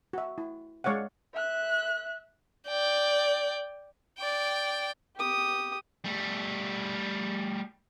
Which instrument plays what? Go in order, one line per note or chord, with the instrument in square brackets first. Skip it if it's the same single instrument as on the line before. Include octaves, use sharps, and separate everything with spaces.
[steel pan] F#4 E5
E4
G#3 C#5 D5 F5 F#5
[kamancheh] E5 F#6
[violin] D5 G5
[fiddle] D5 G5
[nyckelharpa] G4 D#6
[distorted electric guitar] G3 A3